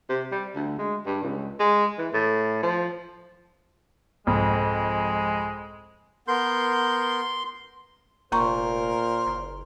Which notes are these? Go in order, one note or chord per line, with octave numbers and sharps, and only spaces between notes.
C3
G3
D2
G#3
G2
C#2
G#3
E3
A2
F3
C2 F2 G#2 G#3
B3 A#4 C6 G6
F1 A#2 A#3 A#4 C5 A#5 C#6
F#1